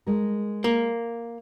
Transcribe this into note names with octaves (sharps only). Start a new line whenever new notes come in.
G#3 A#4
A#3